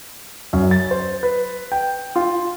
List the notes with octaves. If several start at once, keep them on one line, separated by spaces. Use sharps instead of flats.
F#2
A6
C5
B4
G5
F4